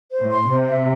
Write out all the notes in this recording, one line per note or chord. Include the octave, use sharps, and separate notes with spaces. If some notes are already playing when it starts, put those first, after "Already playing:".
C5
A2
C6
C3 C5
E5